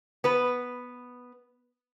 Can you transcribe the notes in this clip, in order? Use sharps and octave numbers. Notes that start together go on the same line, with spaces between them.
B3 B4